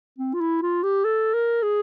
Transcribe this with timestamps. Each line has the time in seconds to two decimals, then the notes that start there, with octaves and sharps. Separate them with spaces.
0.19 C4
0.34 F4
0.41 E4
0.62 F4
0.83 G4
1.05 A4
1.34 A#4
1.63 G#4